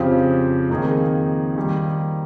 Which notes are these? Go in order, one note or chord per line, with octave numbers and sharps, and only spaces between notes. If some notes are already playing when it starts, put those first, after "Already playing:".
Already playing: F2 C#3 F3 C4 G4
F2 D#3 A#3 D#4 G#4
D#3 G3 A#3